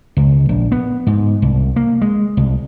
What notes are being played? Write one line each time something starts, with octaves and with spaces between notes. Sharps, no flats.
C#2
A#1
B3
G#2
C2
A#3
G#3
C2